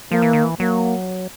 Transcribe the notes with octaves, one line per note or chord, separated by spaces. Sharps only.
F3 A#3
E3
D#3
E3
F#3 A#3